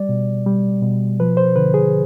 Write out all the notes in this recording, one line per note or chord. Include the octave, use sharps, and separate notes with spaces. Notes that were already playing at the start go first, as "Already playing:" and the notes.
Already playing: G3 D5
B2
G3
B2
F3 B4
C5
D3 B4
G#4